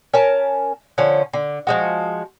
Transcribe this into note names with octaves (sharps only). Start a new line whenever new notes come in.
C#4 A#4 A5
D3 F3 C#4
D3
F3 G#3 F#4